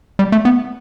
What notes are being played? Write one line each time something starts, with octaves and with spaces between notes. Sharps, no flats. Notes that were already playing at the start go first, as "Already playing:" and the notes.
G3
A3
B3